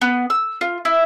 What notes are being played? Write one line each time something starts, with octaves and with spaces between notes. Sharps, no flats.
B3
E6
F4
E4